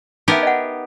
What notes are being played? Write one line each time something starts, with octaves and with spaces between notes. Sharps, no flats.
B3 D#4 G4 A#4 E5
D#5 F#5